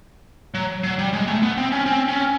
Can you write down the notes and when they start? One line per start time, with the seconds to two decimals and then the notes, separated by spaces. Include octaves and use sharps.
0.54 F#3
0.84 F#3
0.98 G3
1.13 G#3
1.28 A3
1.42 B3
1.57 C4
1.72 C#4
1.86 C4
2.08 C#4